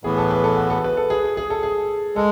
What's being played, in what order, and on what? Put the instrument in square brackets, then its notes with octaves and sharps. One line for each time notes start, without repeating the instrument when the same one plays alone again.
[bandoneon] A2 E3 B3 [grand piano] G#4
[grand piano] A4
B4
A4
F#4
A4
B4
A4
G#4
G#4
A4
G#4
[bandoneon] G#3 [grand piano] A4